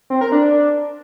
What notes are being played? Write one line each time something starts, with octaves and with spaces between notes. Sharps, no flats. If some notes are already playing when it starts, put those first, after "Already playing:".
C4
A#4
D4